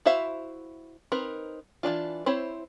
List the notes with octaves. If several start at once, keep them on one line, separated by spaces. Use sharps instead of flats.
E4 F#4 C5 E5 F5
C4 D#4 A#4 B4
E3 F3 D4 F4
C4 E4 C5 C#5 B5